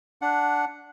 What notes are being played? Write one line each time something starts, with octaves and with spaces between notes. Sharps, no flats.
D4 F#5